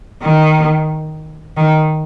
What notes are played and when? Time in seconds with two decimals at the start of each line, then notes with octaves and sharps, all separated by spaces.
0.22 D#3
1.57 D#3